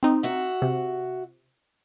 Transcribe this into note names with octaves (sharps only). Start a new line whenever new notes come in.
C4 D#4
F#4 E5
C3